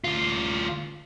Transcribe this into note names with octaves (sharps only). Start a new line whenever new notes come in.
D2 F4